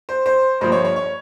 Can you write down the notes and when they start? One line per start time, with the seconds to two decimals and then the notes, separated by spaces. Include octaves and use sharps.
0.09 C5
0.26 C5
0.61 G1 G2 F3 A#3 C5
0.72 C#5
0.85 C#5
0.96 C#5